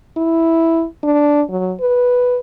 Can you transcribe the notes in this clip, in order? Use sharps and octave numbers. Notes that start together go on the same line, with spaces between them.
E4
D4
F#3
B4